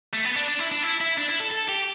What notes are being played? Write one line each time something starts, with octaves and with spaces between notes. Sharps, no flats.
A3
B3
D4
D4
E4
D4
E4
E4
D4
E4
A4
A4
G4